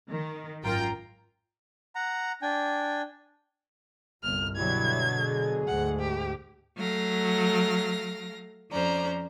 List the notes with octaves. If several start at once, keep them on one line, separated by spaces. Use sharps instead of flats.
D#3
G#1 F#2 F4 A#4 G5 A#5
F#5 A#5
D4 G5 G#5
G1 C2 F6
B2 D3 F#3 G3 E4 G#6
G#4
D2 G#2 F#5
G4
F#3 A3 F5 A#6
F2 C#4 C5 D5 A#5